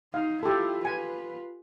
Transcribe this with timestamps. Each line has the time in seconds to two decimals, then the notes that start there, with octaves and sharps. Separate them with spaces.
0.14 D#4 F5
0.43 E4 F4 G4 A4
0.85 F4 B4 G#5